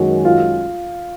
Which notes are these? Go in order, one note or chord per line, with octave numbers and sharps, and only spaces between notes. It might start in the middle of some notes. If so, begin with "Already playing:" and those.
Already playing: F#2 D#3 G#3 C#4 F#4
F4